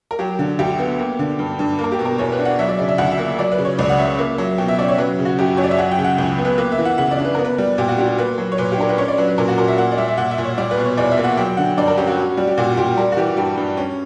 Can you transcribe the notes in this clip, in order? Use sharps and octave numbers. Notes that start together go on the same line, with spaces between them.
A#4
F#3 G4
D3
D2 G4
B3
A#3
D3
G2
G2
A#3
A#4
G4
B2
A#4
E2 C#5
B4
D4
F#5
F#3 E5
D5
C#3 D5
E5
D2 F#5
E5
A#3
E5
F#3 D5
B4
C#3
C#5
C#2 D5
F#5
C#4 E5
A#3
F#3
B2 G5
E5
C#4 D5
C#5
F#3 B4
C#3
F#4
F#2 G4
F#2 C#5
D5
E5
F#3 F#5
G5
C#3
F#5
C#2 G5
B3
B4
A#3 B4
E5
E3
F#5
C#3 F#5
D5
D4
B4
B3 A#4
B4
G3
A#2 G4
F#4
D4 G4
A#3 B4
F#3
C#5
A#2 B4
G4
D4 A#4
B4
C#4 C#5
D5
F#3 B4
B4
A#2 A#4
F#4
A#2 A#4
E5
A#3 F#5
D5
G3 E5
E5
A#2 F#5
E5
A#2
C#5
G3 D5
B4
B2
C#5
E2 D5
E5
A#3
F#5
F#3 G5
D3 F#5
G2 D5
A#4
C#4 G4
F#4
C#4
G3
G4
A#2 F#4
A#2 G4
G3 A#4
F#4
E3 G4
G2 G4
G2
C#4